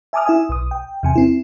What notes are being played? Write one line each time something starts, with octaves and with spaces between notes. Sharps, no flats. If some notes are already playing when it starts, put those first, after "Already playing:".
E5 G#5 A5 D6 D#6 F6
E4 E5 G#5 D#6
B1 D#6
G5
E2 C3 G#5
C4 E4